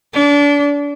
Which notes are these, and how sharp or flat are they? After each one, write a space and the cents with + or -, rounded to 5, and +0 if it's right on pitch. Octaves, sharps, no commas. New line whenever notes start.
D4 -30